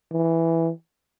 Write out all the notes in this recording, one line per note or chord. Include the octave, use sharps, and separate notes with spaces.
E3